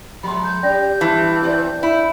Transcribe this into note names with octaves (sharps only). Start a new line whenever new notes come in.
F3 G#3 B5 C6
G6
C#4 G4 D5 G5 A#6
G2 E3 G3 A5
B3 C4 D5
E4